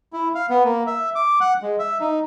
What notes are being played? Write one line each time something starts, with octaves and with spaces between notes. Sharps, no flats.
E4
F5
B3
A#3
E5
D6
F#5
G#3
E5
D#4